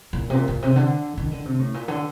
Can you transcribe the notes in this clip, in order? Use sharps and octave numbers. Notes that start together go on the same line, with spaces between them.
A#2
C3
A#2
A#2
C3
D3
D#3
D3
C3
A2
A#2
D3